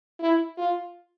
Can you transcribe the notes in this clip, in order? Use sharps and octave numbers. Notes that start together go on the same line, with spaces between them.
E4
F4